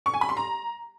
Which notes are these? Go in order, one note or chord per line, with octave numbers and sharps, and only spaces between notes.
C#6
G#5
B5
C6
A#5